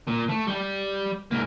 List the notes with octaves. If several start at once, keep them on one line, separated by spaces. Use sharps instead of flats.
A#2
A3
G3 G4
G#2 A#3